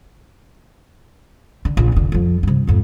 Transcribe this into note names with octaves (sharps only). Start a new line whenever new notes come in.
D3
A#1
F1 D3
F2 F3
G2 C3
F2 G#2